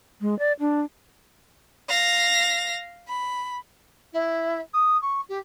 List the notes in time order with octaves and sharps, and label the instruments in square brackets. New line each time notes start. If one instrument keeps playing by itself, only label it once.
[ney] G#3
D5
D4
[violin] F5 A#6
B5
[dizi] E4
D#6
C#6
G4